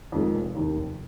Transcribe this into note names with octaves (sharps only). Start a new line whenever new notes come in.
F2 D#3 G#3
F1
D#2 D#3
F1